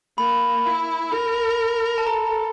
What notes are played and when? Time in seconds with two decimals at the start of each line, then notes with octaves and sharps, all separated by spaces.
0.18 A#3 B5
0.65 E4
1.12 A#4
1.98 A5
2.06 A4 A#5
2.27 A#5